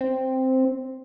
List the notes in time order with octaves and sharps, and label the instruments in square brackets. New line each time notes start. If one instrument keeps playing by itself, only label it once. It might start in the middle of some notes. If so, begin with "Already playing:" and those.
[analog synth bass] C4